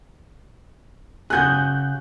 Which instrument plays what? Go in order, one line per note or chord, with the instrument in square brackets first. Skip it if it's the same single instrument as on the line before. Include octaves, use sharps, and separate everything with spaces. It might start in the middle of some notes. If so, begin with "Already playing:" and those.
[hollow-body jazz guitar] C#3 F#4 G#4 [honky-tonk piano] F#6 G6